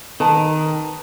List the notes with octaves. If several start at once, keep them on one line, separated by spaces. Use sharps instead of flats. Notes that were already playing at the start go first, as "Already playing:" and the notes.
D#3 B4 A5